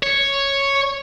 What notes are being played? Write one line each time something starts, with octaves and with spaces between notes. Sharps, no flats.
C#5